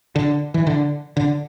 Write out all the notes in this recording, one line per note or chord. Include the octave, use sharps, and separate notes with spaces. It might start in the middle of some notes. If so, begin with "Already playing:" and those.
D3
E3
D3
D3